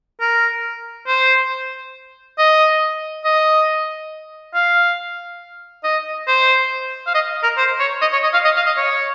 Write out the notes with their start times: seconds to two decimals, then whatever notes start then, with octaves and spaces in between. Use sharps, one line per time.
0.21 A#4
1.07 C5
2.39 D#5
3.25 D#5
4.55 F5
5.84 D#5
6.28 C5
7.07 F5
7.15 D#5
7.43 A#4
7.58 C5
7.80 C#5
8.01 D#5
8.13 C#5
8.24 D#5
8.33 F5
8.45 D#5
8.56 F5
8.66 D#5
8.77 C#5